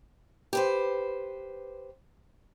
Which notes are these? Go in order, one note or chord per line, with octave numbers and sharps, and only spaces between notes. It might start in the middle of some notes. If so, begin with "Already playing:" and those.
G4 B4 C5